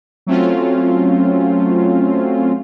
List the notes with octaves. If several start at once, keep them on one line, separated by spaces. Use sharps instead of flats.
F#3 A3 C4 C#4 F4